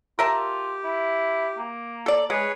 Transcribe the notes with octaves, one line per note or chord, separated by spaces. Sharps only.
F4 G4 A#4 E5 A5
E4
A#3
A4 D5
G#3 G#4 B4 C#5